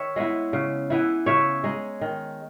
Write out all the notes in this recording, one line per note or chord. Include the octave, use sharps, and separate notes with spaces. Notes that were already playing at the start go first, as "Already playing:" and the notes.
Already playing: D#3 C#5 E5
G#3 B3 E4
C#3
E3 B3 E4
C#3 C#5 E5
G#3 D#4
D#3